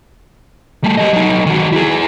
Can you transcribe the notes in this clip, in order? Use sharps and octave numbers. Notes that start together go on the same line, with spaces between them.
G3 A3
G4 D#5
F#3 D#4
D#3 F#4
E4 G#4